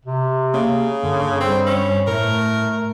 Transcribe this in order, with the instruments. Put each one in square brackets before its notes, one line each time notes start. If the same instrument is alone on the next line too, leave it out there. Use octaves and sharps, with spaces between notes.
[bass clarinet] C3
[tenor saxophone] C#3 [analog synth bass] A#3
[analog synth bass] G2 [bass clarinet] D3
[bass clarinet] G3 [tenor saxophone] C4
[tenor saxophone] C#4
[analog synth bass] A2 [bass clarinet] A3 [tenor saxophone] A#4